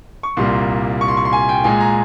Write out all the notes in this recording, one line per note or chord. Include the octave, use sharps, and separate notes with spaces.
C#6
C2 A#2 G3 A#3 C6
C#6
C6
C#6
C6
G#5
G5
A#2 G#3 G#5
A#5